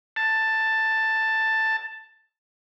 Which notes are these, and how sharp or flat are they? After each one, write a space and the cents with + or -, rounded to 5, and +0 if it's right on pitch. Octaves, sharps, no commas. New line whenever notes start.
A5 +10